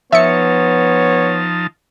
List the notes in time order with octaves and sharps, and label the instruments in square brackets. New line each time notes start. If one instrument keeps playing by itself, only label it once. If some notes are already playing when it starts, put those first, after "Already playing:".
[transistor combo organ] F3 D#4 A5 [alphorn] B3 [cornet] C#5 [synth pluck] E5 C#7